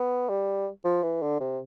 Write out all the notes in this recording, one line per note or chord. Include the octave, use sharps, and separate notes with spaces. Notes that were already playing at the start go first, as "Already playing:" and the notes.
Already playing: B3
G3
F3
E3
D3
C3